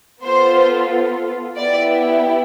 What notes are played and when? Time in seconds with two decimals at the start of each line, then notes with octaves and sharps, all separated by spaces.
0.23 B3 F4 A4 C5
1.56 B3 E4 G4 D5